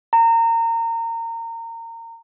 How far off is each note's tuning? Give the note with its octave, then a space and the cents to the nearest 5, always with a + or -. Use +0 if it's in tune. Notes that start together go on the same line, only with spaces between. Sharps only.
A#5 -25